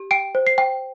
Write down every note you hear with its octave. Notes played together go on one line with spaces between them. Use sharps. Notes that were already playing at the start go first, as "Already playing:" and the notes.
Already playing: G4
G5 D7
C5
C7
G5